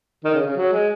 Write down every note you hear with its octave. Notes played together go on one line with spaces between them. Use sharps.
D#3
C#3
C#3
F#3
G#3